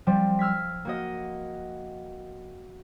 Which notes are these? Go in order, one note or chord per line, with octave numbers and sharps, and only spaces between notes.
F3 G3 C4
E6 F6 G#6 B6
A#3 F#4 D#5